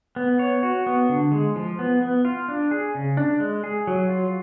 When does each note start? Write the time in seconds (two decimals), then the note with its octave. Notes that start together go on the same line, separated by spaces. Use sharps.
0.16 B3
0.39 C#5
0.63 F#4
0.86 B3
1.09 D3
1.32 G#3
1.56 F3
1.79 B3
2.02 B3
2.25 F4
2.49 D4
2.71 G#4
2.95 C#3
3.17 D4
3.40 G#3
3.64 G#4
3.87 F#3
4.09 F4